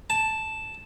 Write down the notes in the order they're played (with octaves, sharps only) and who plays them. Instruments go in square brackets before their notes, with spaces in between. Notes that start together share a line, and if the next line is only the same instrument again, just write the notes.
[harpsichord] A5